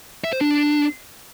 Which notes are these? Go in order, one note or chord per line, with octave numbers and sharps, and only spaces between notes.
E5
C5
D4